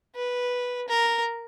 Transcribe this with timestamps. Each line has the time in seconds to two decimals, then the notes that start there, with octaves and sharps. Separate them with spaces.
0.16 B4
0.88 A#4